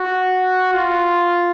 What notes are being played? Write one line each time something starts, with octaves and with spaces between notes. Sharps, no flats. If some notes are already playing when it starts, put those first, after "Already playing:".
Already playing: F#4
F4